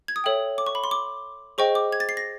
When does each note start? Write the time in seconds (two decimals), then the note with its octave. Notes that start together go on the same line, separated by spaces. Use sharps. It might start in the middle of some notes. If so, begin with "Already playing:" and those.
0.08 G#6
0.16 D#6
0.24 A4 C#5 E5 G5
0.58 D6
0.67 C#6
0.75 B5
0.84 C6
0.91 D6
1.58 G#4 C5 D#5 G5 C#6
1.75 D6
1.92 G#6
2.00 A6
2.09 C7
2.17 A#6